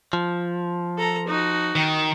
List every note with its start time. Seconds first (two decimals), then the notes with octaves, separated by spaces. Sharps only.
0.13 F3
0.98 A4 A#5
1.28 D#4 F#4
1.76 D#3